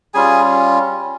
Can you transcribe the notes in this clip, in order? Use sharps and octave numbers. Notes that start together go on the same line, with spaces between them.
G3 C#4 F4 G#4 G#5